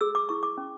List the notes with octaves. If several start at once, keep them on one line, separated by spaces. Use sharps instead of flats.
G#4 E6
D6
E4 C#6
D6
C#4